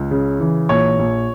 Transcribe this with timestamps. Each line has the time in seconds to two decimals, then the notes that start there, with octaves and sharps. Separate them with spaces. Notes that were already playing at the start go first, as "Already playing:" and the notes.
Already playing: C#2
0.11 C#3
0.40 E3
0.69 A#1 C#5
0.99 A#1